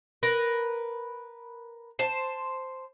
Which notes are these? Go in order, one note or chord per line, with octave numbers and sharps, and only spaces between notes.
A#4 B4
C5 A5